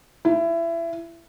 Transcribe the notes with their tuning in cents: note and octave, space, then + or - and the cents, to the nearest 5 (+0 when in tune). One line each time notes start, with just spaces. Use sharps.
E4 +25